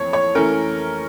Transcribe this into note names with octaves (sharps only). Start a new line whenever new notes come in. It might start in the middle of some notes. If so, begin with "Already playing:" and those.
Already playing: F2 E3 A3 C#5
C#5
E3 A3 C#4 A#4